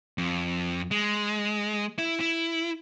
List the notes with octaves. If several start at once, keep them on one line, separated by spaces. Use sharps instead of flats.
F2
G#3
E4
E4